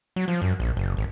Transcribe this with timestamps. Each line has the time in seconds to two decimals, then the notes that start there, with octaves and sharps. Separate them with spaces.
0.16 F#3
0.28 F3
0.42 F#2
0.60 A#1
0.77 F#1
0.97 G#1